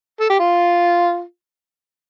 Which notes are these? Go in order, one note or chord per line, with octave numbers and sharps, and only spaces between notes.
A4
G4
F4